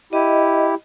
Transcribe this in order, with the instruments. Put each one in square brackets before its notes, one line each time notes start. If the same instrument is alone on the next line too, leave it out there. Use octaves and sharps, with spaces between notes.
[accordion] E4 G4 [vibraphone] D#5